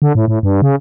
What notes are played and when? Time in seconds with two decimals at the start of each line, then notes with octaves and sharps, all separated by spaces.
0.02 D3
0.15 A2
0.28 A2
0.43 G2
0.62 C#3